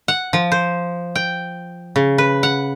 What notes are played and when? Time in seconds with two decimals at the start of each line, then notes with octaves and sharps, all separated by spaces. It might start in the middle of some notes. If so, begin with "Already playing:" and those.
0.08 F#5
0.33 F3
0.52 C5
1.15 G5
1.96 C#3
2.18 B4
2.43 F#5